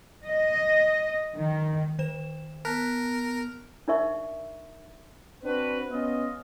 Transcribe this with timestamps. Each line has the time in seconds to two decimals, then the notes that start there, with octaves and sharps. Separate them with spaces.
0.24 D#5
1.33 D#3
1.99 D#3 C5 E7
2.65 B3 A#4 A5 F#6 B6
3.88 D4 D#4 A#4 D5 E5 C#6
5.43 C4 D4 F#4 B4
5.90 B3 C#4 F4 D#5